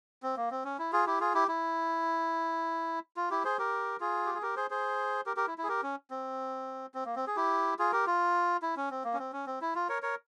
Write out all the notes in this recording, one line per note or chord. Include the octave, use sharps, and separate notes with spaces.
C4
A#3
C4
C#4
E4
F4 G#4
E4 G4
F4 G#4
E4 G4
E4
F4
E4 G4
G#4 C5
G4 A#4
F4 G#4
G4
G#4
G4 A#4
G#4 C5
G#4 C5
G4 A#4
G4 A#4
E4
E4
G#4
G4 A#4
C#4
C4
C4
A#3
C4
G#4
E4 G4
F4 G#4
G4 A#4
F4
E4
C#4
C4
A#3
C#4
C4
C#4
C4
E4
F4
A#4 C#5
A#4 C#5